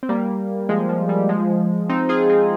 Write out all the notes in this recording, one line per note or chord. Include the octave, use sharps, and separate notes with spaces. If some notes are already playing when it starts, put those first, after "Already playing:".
C4
G3 A#3
F3 G#3
F3
G3
F3 G#3
C4 D#4
F4 G#4
C4 D#4